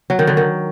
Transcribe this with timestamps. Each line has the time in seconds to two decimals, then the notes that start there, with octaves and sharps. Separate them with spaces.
0.10 F#3
0.19 D#3
0.27 D3
0.37 D#3